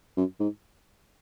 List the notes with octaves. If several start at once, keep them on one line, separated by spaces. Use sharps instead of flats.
F#2
G#2